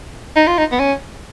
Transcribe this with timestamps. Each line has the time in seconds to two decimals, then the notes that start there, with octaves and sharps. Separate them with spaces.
0.36 D#4
0.47 F4
0.58 D#4
0.72 B3
0.80 C#4